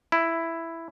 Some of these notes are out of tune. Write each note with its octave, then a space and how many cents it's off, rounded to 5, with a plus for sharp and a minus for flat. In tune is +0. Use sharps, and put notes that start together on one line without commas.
E4 +5